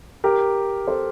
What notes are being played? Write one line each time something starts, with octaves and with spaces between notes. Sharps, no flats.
G4 A#4
A4 C5